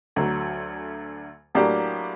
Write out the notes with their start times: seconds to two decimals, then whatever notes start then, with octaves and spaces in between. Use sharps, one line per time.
0.16 D2 D3 F#3
1.55 A2 F#3 A#3 D4 G4